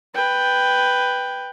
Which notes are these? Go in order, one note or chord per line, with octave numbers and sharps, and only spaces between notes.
B4 G5